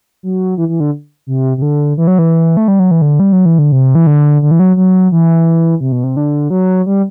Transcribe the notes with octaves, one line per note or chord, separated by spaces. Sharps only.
F#3
E3
E3
D3
C3
C3
D3
E3
F#3
E3
A3
G3
F#3
E3
D3
G3
F#3
E3
D3
C3
E3
D3
D3
E3
F#3
F#3
E3
C3
B2
C3
D3
F#3
G3